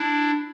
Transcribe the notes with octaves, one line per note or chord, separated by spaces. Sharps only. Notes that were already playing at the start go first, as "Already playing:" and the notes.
Already playing: D4 E4